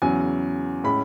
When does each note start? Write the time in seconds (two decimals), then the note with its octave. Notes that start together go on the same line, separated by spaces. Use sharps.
0.02 E2 C#3 F#3 C#4 G#5
0.84 A2 G#3 C#4 B5